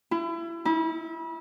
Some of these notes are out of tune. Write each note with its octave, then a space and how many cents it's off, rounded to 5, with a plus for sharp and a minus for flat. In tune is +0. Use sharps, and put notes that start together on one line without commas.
E4 +30
E4 -35